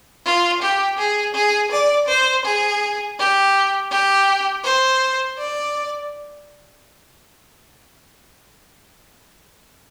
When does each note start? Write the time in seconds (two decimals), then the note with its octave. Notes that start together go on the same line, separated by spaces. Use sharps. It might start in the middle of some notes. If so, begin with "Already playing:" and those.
0.25 F4
0.62 G4
0.98 G#4
1.35 G#4
1.72 D5
2.08 C5
2.45 G#4
3.19 G4
3.91 G4
4.64 C5
5.38 D5